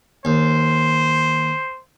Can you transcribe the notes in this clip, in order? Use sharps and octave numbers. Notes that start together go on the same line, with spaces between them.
D#2 C5